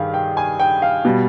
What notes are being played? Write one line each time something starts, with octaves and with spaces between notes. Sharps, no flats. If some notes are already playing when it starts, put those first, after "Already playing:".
Already playing: G2 D#3 G4 G#4 F5
G5
G#5
G5
F5
B2 G3